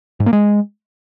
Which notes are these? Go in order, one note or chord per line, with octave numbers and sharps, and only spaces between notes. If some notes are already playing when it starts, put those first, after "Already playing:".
G#2
A#3
G#3